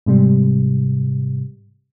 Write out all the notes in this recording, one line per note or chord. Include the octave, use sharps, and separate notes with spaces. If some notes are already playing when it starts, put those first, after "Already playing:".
G#2 C3 G3